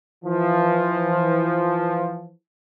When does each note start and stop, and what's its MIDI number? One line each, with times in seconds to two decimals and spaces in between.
0.25 2.31 52
0.25 2.31 53